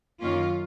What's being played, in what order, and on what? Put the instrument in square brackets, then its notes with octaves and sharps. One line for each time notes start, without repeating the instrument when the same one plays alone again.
[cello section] F#2 D#3 A#3 C#4 F4